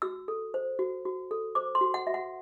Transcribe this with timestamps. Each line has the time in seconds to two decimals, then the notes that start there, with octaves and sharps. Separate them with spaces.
0.02 F#4 E6
0.28 A4
0.54 C5
0.79 F#4
1.05 F#4
1.31 A4
1.55 C5 D6
1.75 C6
1.81 F#4
1.94 F#5
2.07 F#4 E5
2.14 F#5